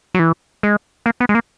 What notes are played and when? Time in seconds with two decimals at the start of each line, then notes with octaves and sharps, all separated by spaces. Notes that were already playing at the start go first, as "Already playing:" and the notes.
0.14 F#3
0.19 E3
0.63 G#3
1.06 A#3
1.20 B3
1.29 G#3
1.35 A#3